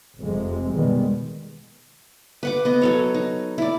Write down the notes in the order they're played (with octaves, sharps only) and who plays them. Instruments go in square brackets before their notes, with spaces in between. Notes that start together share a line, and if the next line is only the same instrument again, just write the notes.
[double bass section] F1 F2 C3 G#3
B2 D#3 G3 G#3 B3
[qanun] B4 F#5 D6
B3 D#5
F#3 A4 C#5
D#4
E4 D5